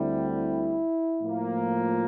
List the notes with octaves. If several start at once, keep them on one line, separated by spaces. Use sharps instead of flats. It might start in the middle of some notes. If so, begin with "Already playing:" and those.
Already playing: D2 D3 G3 C4 E4
E4
A2 F3 A#3
F4